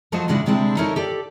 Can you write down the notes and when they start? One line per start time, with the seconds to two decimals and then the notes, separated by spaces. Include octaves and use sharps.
0.12 F3 F#3 A3 F#4 C5 D#5
0.28 A2 C#3 G#3 D4 E4 F#4
0.46 D2 C3 G#3 C4 D4 E4
0.77 D#4 E4 A4 A#4 C#5
0.96 G4 A4 D5